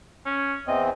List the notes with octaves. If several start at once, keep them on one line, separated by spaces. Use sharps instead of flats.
C#4
E2 E3 C4 D#5